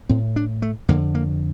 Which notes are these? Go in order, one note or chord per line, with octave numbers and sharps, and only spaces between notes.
A2 C4
D4
A3
F2 D3 A#3
A#3